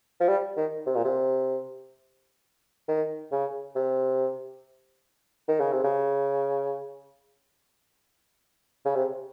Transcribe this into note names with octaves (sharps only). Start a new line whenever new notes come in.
F3
G3
D#3
C3
A#2
C3
D#3
C#3
C3
D#3
C#3
C3
C#3
C#3
C3